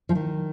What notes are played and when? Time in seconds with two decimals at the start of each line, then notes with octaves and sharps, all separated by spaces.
0.09 F3
0.15 D#3